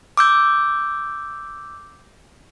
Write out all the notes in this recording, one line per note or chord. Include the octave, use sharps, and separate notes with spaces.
D6 E6 G6